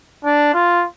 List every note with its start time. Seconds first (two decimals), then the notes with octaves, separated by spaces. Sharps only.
0.25 D4
0.54 F4